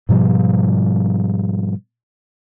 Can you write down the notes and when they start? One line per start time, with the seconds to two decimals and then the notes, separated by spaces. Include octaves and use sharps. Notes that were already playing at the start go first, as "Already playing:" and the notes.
0.09 G#2 B2 F3 G3